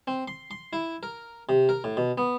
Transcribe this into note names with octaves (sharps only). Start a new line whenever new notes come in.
C4
C6
C6
E4
A#4
C3
A#4
A2
B2
B3